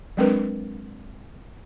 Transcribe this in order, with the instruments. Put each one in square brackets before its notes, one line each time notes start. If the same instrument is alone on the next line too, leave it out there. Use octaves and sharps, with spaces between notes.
[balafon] F#3 G#3 C4 D4 A#4 B4